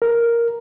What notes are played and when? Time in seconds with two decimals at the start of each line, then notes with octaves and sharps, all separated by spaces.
0.02 A#4